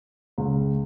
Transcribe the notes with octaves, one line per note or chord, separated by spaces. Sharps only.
C#2